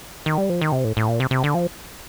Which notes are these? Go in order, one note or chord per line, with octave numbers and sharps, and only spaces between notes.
D#3
G3
F3
D#3
C3
A2
A2
A#2
C3
C3
D3
F3